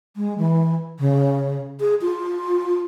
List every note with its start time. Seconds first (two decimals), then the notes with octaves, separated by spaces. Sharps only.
0.16 G#3
0.38 E3
0.99 C#3
1.80 G#4
2.01 F4